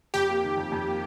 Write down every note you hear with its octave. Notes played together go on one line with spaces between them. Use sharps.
F2 G4
A#3
D#3
F2
F2
A#3